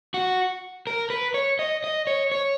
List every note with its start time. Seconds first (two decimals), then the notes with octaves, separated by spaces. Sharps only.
0.14 F#4
0.87 A#4
1.10 B4
1.34 C#5
1.59 D#5
1.84 D#5
2.07 C#5
2.32 C#5